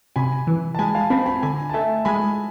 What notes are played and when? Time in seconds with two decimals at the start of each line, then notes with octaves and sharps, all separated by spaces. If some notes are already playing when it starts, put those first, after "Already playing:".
0.16 C3 G#5 B5
0.47 E3
0.75 A5
0.79 G#3 G#5 B5
0.95 F5 A5
1.10 C4 G#5 B5
1.26 G#5 B5
1.43 D3 G#5 B5
1.70 A5
1.73 A3 E5 G#5
2.05 G#3 G#5 B5